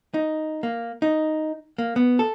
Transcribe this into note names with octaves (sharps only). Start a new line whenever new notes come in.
D#4
A#3
D#4
A#3
B3
A4